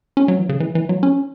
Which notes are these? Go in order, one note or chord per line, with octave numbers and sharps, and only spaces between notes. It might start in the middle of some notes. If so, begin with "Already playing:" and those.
C#4
F#3
E3
C#3
E3
E3
F#3
C#4